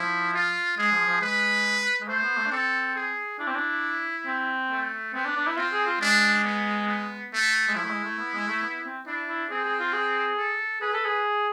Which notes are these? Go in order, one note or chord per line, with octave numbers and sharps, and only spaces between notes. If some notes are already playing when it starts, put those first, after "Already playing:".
Already playing: F3 E4
F4
G#3 G#4
F3
F3
G#3 B4
G#3
A3 C5
B3
A3
D4
C4 A4
G#4
D4 E4
C4
D4
C4
A3
B3 C4
D4
D4
E4
C4 F4
G#4
F4
G#3 D4
B3
B3
A3
G#3
F3 E4
A3
G#3
A3
B3
G#3
A3
B3
C4
D4 E4
E4
C4 G#4
G#4
F4
G#4
A4
G#4 B4
A4
G#4